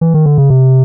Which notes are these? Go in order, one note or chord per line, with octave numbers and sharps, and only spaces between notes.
E3
D#3
D3
C#3
C3